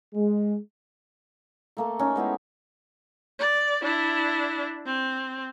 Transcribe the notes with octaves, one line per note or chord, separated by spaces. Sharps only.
G#3
A3 A#3 A4
C#4 D#4 A4
G#3 B3 E4 G4
D5
D4 E4
C4